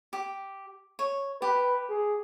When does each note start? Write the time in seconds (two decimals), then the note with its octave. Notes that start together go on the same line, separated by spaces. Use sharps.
0.13 G4
0.99 C#5
1.42 G4 B4
1.89 G#4